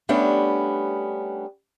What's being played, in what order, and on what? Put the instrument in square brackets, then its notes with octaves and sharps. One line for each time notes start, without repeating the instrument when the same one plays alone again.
[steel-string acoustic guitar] G3 A3 B3 C#4 D4 G4